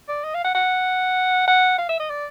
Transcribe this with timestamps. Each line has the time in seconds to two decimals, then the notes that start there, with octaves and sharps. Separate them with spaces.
0.08 D5
0.24 D#5
0.34 F5
0.44 F#5
0.55 F#5
1.48 F#5
1.78 F5
1.89 E5
1.99 D#5
2.10 D5